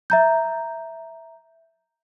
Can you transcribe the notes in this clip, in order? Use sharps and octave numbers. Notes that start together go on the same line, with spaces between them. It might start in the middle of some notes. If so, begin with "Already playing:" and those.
E5 A#5 G6